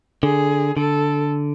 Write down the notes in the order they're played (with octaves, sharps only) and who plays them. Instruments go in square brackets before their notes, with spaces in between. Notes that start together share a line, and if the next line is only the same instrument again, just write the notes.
[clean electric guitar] D3 [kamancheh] G#4
[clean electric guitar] D3 [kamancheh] A4